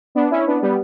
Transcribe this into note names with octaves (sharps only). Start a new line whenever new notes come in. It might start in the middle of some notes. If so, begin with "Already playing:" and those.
B3 D4
C#4 E4
B3 D4
G3 B3